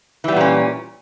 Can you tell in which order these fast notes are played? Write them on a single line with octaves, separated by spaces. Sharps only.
E3 G3 B3 A#2 C#4